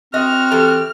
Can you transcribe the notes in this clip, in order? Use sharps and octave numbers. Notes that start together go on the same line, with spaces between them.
C4 F#4 D#5 F6
E3 G4 A4